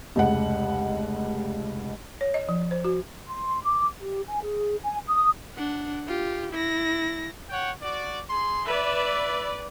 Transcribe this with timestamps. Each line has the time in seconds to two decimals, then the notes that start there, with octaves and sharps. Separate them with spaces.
0.16 F1 C#2 F#5
2.21 C#5
2.34 D#5
2.49 F3
2.71 C5
2.85 F#4
3.28 C6
3.63 D6
3.99 G4
4.27 G#5
4.42 G#4
4.83 G#5
5.07 D#6
5.55 D4 F#5
6.07 F4 G4
6.52 E4 A#6
7.49 C#5 F#5 G5
7.82 F#4 D5
8.30 G#4 C6
8.65 B4 D5 E5